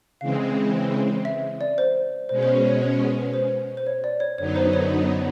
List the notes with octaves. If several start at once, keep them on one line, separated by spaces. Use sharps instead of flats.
C#3 E3 G#3 C4 F5
E5
D5
C5
B2 G#3 C#4 C5
C5
C5
C#5
C#5
B4
C5
C5
C#5
D5
C#5
F#2 D3 F#3 B3 D#4 C#5
C5
C#5